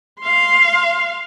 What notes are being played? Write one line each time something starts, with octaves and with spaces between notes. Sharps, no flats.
F5 C6